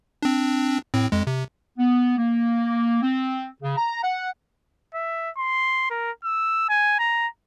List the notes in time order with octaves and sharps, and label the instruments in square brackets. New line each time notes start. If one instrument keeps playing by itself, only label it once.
[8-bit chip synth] C4 D4
A2 C4
F2 G#3
C3
[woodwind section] B3
A#3
C4
C#3
A#5
F#5
[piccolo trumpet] E5
C6
A#4
E6
G#5
A#5